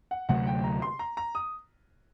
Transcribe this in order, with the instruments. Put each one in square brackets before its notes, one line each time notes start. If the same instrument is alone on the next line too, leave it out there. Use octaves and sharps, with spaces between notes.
[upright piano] F#5
[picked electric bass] D2 C3 F#3 A3 [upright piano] F#5
[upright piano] G5
A#5
C6
A#5
A#5
D#6